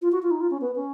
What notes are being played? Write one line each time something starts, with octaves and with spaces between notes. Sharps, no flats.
F4
F#4
F4
D#4
F4
C#4
B3
C#4